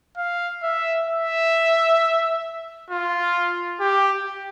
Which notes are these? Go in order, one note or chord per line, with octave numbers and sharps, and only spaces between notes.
F5
E5
E5
F4
G4